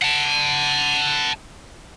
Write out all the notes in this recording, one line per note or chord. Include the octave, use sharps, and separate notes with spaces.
F#5 A5